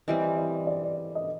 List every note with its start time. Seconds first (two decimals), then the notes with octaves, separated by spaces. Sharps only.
0.08 E3 G3 C4 D#5
0.37 D5
0.67 D5
1.15 D#5